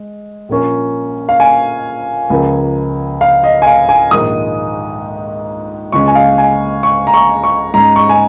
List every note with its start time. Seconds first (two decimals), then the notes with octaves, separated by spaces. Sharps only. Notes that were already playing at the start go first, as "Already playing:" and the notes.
Already playing: G#3
0.49 A#1 A#2 A#3 C#4
1.29 F5
1.40 G#5
2.30 C#2 C#3 F3 A#3
3.21 F5
3.44 D#5
3.62 G#5
3.67 F5
3.89 G#5
4.11 A#1 G#2 D#3 G#3 D#6
5.92 C#2 C#3 G#3 C#4 C#6
6.08 G#5
6.15 F5
6.38 G#5
6.83 C#6
7.07 A#5
7.14 C#6
7.44 C#6
7.74 G#2 G#3 C#4 A#5
7.96 C#6
8.09 G#5